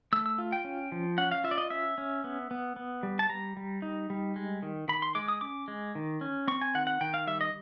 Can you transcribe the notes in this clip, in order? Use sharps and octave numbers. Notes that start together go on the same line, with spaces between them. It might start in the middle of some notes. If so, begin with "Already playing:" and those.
A3 E6
E6
F4
G5
C#4
F3
C#4 F#5
F5
F4 E5
D5
D#5
C#4 E5
C#4
B3
B3
B3
G3
A5
G3 A#5
G3
D#4
G3
G#3
D#3
D#3 B5
C6
G#3 D6
D#6
C#4 D6
G#3
D#3
C#4
C4 C#6
G#5
D#3 F#5
F#5
D#3 G5
F5
G3 E5
D#5